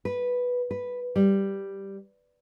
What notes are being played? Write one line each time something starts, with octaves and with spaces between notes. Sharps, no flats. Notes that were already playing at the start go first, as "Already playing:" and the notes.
B4
B4
G3